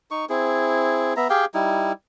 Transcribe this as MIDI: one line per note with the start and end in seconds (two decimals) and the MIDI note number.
0.11 0.25 63
0.11 0.25 85
0.29 1.14 60
0.29 1.14 64
0.29 1.14 68
1.17 1.28 59
1.17 1.28 76
1.17 1.28 82
1.30 1.45 67
1.30 1.45 68
1.30 1.45 77
1.30 1.45 79
1.54 1.92 55
1.54 1.92 63
1.54 1.92 64